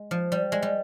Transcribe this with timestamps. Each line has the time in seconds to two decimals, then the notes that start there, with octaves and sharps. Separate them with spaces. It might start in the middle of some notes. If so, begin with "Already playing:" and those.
Already playing: G#3
0.11 F3
0.32 G3
0.52 G#3
0.63 G3